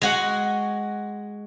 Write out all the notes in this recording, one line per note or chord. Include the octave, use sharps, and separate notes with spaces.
G#3 F#4 F#5